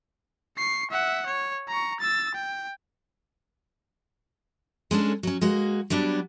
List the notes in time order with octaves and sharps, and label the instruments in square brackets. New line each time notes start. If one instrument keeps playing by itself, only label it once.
[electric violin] C#6 C7
E5 F#5
C#5
A#5 C#6
E6 A6
G5
[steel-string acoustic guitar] G#3 C#4 D4 A4
F#3 C#4
G#3 A#3 F#4
F#3 G3 B3 D4